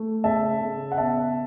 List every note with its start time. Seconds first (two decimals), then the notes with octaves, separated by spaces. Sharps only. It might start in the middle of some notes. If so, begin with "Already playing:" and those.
Already playing: A3
0.24 C#3 E5 A5
0.61 C#3
0.92 F#5
0.98 B3 E5 A5